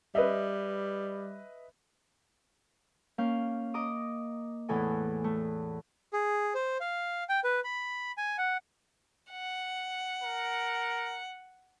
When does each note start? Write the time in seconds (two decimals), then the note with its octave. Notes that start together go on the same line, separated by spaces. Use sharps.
0.15 G3 B4 D#5 E5
3.18 A#3 C#4 F5 G6
3.74 D#5 A#5 D6 D#6
4.69 E2 A2 E3 A4 G#5
5.24 A3
6.13 G#4
6.55 C5
6.80 F5
7.29 G5
7.44 B4
7.64 B5
8.18 G#5
8.38 F#5
9.32 F#5
10.23 A#4